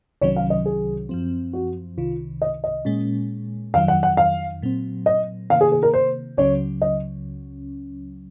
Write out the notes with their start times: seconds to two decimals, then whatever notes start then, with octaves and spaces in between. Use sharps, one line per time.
0.21 C2 C3 D#3 F#3 C#4 C#5
0.36 F5
0.50 D#5
0.66 G#4
1.09 F#2 F3 C4
1.53 F#4
1.97 C2 C3 D#3 F4
2.42 D#5
2.64 D#5
2.85 A#2 G#3 C#4
3.74 F2 D#3 F#3 F5
3.88 F#5
4.03 F#5
4.17 F5
4.62 A#2 F#3 C4
5.06 D#5
5.50 C3 D#3 A#3 F5
5.61 G#4
5.72 G#4
5.83 A#4
5.94 C5
6.37 C#2 C#3 F#3 C#4 C#5
6.82 D#5